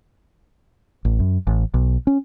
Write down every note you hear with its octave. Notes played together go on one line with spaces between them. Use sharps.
A1
F#2
A1
B1
C#4